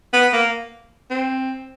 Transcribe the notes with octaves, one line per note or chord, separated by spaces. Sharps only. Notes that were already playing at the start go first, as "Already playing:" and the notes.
B3
A#3
C4